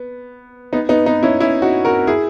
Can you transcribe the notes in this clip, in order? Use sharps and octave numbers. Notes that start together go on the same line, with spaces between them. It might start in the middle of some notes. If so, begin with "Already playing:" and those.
Already playing: B3
B3 D#4
B3 D#4
B3 D#4
C#4 E4
C#4 E4
D#4 F#4
F#4 A#4
E4 G#4